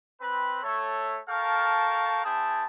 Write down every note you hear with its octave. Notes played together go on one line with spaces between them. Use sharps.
C4 B4 B5
A3 A4 C#5
A4 A#4 F5 G5 A5 C#6
C4 E4 G#4 G5 A5